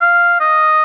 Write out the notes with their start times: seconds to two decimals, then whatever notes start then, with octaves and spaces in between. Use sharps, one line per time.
0.01 F5
0.40 D#5